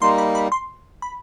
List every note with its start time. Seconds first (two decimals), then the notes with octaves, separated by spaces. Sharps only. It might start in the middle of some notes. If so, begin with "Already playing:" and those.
0.01 G3 A#3 D#4 C6
0.18 B5
0.35 B5
0.52 C6
1.02 B5